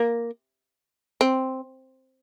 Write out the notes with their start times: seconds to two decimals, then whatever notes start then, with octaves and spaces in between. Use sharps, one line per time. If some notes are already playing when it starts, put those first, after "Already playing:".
Already playing: A#3
1.21 C4